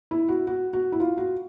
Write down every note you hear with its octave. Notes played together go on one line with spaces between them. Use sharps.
E4
F#4
F#4
F#4
E4
F4
F#4